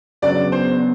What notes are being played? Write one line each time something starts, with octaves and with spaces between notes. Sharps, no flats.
E2 C#3 F#3 B3 D4 D5
C5